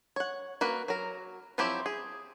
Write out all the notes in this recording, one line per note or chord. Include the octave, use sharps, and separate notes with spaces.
C#5 F#5
A#3 F#4 B4
F#3 A#4
F3 F#3 C4 E4 G4
G#4